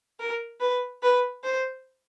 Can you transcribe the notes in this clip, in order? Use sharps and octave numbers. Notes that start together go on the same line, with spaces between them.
A#4
B4
B4
C5